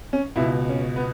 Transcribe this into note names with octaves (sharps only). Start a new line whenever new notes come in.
C#4
C#2 B2 E4
C#4
B3